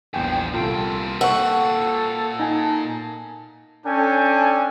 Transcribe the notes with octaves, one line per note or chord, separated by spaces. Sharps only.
A#1 E2 G2 F3 G5 G#5
C2 A#2 F4 A4 G5
A4 F#5 C#6 E6
D#4 G#5 A5
C#4 D4 A4 G5 G#5